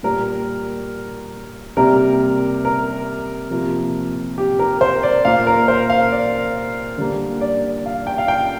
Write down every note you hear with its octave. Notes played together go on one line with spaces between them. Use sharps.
A#2 G3 A#3 A#4
C3 G3 A#3 A#4
A#4
C3 F3 A#3
G4
A#4
C5
D5
A#2 A#3 F5
A#4
C5
F5
D5
D3 G3 A#3
D5
F5
G5
F5
G5